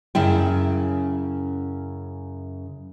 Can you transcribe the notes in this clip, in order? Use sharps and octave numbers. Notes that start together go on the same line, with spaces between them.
F#2 C#3 E4 G5